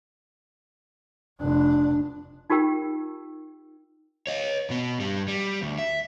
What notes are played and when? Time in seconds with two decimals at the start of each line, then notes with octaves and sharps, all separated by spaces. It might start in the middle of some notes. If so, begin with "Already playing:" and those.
1.41 F1 D4
2.50 D#4 F4 G4 A#4 G5
4.27 C#5 D#5
4.70 B2 B3
5.00 G2 G3
5.28 G3
5.62 D2
5.79 E5